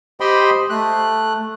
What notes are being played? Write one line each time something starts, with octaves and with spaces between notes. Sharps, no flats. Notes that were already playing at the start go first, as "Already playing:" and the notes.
G4 C5 D#5 G5 B5 C6
A3 F#6